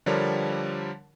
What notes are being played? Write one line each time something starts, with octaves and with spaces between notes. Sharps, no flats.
D3 F3 G3 D4 A#4 C#5